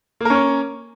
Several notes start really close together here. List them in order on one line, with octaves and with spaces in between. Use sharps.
A#3 A#4 C#4 C#5